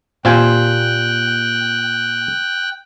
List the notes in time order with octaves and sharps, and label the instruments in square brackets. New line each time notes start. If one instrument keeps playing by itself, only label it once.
[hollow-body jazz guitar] A#2 G4 C5 [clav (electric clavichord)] C4 F4 G#5 [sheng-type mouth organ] G5 F#6